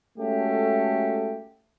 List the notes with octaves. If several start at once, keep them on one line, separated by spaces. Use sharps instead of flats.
G#3 A3 C#4 F#4 G4 A4